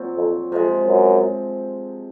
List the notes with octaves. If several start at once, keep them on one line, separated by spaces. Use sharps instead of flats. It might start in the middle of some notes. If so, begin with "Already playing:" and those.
Already playing: A#2 F#3 C4
F2
F2 C3 F3 G#3
F#2